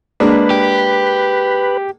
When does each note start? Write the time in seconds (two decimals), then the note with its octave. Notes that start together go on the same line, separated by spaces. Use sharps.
0.20 G#3 A#3 D4 B4
0.50 G4